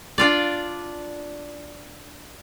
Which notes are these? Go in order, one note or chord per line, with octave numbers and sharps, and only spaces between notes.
D4 F4 D5